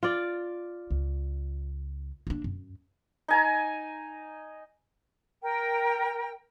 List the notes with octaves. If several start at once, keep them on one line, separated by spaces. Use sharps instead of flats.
F4 D5
C#2
A#3 D4
F#2
D#4 G#5 A#5
A#4 G5